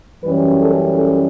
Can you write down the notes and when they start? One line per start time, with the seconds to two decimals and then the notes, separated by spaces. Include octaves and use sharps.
0.24 F#2 E3 G3 C#4 B4
0.60 A4
0.96 A4